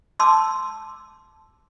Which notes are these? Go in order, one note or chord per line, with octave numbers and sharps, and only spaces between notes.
A5 C6 D6 E6